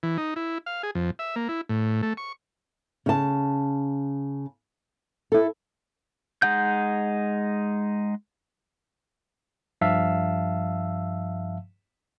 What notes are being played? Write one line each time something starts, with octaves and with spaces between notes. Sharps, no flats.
E3
D#4
E4
F5
G#4
F2
E5
A#3
E4
A2
A3
C#6
C#3 A5
E4 A4
G#3 D#4 F#5 G6
G2 F3 E5 F5 A5 E6